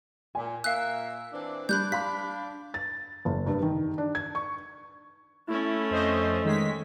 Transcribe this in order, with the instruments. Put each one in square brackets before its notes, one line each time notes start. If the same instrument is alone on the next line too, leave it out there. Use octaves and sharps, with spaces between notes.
[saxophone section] A#2 [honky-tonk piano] G#5
[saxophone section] A#2 A#4 E5 [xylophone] F5 F#6
[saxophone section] E3 C4 D4
[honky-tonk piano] G3 [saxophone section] D4 [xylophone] B5 F#6 G6
[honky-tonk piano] F5 B5 [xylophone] B6
[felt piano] A6
F#1
G2
D#3
D4
G#6
C#6
[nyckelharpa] A3 C#4 [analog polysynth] E4
[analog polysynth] F2 C5 D#5
D#3 G#3 B6